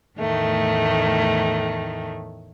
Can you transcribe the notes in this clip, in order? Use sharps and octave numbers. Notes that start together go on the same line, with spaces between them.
E2 A2 D#3 A3